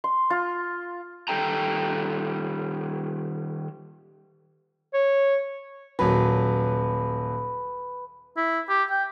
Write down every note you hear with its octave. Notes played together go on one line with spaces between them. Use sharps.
C6
F4
D#3 G3 A4 G5 A#5
C#5
D#1 F#3 B4
E4
G4
G5